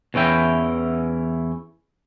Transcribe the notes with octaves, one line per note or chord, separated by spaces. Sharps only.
E2 E3 C#4 E4 G5